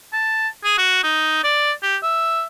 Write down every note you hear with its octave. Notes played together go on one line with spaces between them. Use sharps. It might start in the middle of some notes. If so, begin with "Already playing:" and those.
A5
G#4
F#4
D#4
D5
G4
E5